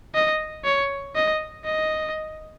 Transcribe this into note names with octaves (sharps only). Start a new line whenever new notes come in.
D#5
C#5
D#5
D#5